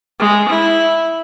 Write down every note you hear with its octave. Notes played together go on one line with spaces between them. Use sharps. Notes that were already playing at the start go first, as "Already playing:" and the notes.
G#3
E4